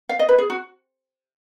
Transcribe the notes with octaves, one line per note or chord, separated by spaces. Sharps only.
F5
D#5
B4
G#4
F#4